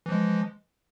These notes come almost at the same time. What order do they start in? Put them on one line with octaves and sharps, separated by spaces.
E3 F3 G#3